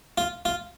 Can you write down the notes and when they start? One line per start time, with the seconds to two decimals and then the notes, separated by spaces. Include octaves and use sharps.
0.18 F4
0.45 F4